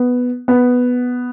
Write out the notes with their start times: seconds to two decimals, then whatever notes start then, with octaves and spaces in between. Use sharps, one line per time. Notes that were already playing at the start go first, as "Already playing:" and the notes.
Already playing: B3
0.48 B3